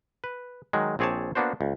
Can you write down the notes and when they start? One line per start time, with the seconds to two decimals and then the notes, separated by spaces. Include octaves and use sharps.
0.24 B4
0.73 D#3 F#3 G#3
0.99 A#1 C4 G#4 C#5 D5 A5
1.35 A#3 B3 D4 F#4 C5
1.61 C#2